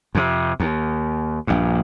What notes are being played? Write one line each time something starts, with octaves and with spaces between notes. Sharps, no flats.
F2 C3
D#2
A#1 G2